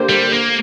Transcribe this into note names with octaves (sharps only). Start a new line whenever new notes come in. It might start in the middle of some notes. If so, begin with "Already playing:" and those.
Already playing: D3 A#3 G4 C5
G3
A#3